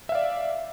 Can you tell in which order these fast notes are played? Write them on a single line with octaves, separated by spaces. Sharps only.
E5 F5 D5